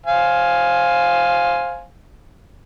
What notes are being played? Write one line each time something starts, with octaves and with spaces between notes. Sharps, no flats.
C5 F5 G#5